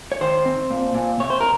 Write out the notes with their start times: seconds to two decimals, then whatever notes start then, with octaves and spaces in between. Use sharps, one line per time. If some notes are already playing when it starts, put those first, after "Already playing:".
0.12 C#5
0.21 D#3 C5
0.46 C4
0.71 A#2
0.95 A#2
1.20 C3 C#5
1.30 C5
1.41 A#4